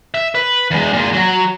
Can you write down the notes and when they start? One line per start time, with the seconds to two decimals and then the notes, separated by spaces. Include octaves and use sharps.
0.14 E5
0.35 B4
0.71 E2 G#3
0.93 A#2 G#3
1.13 F#3 F#4